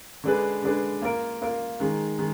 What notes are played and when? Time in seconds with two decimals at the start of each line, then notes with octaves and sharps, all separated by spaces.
0.24 D3 G#3 D4 G#4 B4
0.62 D3 G#3 D4 G#4 B4
1.02 A#3 F4 A#4
1.41 A#3 F4 A#4
1.80 D#3 G#3 D#4
2.19 D#3 G#3